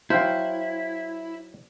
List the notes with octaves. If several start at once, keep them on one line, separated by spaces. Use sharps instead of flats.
F#3 E4 C5 F5 G5